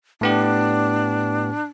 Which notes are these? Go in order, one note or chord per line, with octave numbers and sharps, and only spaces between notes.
A2 B3 D4 G4